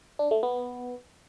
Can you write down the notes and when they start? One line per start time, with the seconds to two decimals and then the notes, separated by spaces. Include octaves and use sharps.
0.19 D4
0.31 A3
0.43 B3